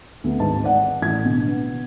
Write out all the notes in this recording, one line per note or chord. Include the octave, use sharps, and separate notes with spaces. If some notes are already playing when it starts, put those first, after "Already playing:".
D2 B3
G#1 G#2 B4 A5
D5 F#5
A1 G#6
B2 D3
B3